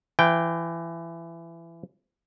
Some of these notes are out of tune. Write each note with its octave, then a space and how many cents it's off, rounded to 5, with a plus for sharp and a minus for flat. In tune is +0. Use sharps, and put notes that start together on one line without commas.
E3 +25 G5 +0